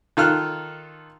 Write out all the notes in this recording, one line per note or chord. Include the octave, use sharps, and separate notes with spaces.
D#3 F4 A4 F6 F#6